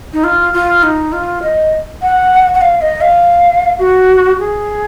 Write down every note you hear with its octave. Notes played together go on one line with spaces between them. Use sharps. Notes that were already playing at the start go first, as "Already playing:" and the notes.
D#4
F4
F4
D#4
F4
D#5
F#5
F#5
F5
D#5
F5
F#4
G#4